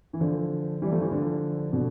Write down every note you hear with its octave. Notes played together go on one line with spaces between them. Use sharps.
E3
D3 F3
E3 G3
F3 A3
E3 G3
D3 F3
B2 D3